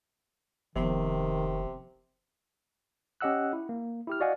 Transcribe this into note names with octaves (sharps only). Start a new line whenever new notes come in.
F1 C3 D#3 F3 B3 C5
C#4 G4 D#5 F#5 E6 F#6
E4
A#3
E4 G4 F6
F#4 D5 D#5 F5 F#5 G#5